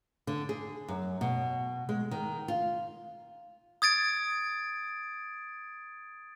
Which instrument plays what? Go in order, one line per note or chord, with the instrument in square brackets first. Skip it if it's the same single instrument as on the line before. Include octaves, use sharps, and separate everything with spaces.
[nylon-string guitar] D3
G#4
F#2
B2
G#3
D#3
F4
[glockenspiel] D#6 G#6 A6 D7